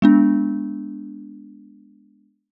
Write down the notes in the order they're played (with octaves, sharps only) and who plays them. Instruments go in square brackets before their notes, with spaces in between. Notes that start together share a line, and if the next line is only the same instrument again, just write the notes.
[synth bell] G#3 B3 D4